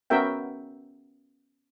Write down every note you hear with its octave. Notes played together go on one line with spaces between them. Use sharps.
B3 C#4 F#4 A#4 E5 G5